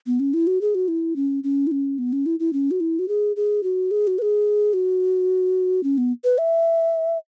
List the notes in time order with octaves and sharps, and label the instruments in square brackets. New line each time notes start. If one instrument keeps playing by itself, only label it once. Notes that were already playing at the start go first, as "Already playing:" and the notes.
[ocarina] B3
C#4
E4
F#4
G#4
F#4
E4
C#4
C#4
E4
C#4
B3
C#4
E4
E4
C#4
F#4
E4
F#4
G#4
G#4
F#4
G#4
F#4
B4
G#4
F#4
C#4
B3
B4
E5